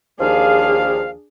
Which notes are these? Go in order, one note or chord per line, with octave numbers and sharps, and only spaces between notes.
D#2 F3 D4 G#4 F5